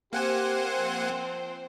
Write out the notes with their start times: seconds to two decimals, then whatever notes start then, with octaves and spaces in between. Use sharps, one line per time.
0.13 A#3 C4 G4 C5 F#5 G#5
0.79 F3